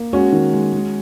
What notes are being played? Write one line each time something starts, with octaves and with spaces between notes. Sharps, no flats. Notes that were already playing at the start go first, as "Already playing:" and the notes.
Already playing: A#3
G#3 C#4 F#4
D#3
G#3
G#3